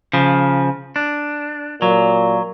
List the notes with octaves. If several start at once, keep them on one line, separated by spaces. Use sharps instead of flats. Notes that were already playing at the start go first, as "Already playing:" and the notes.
C#3 F3
D4
A#2 F#3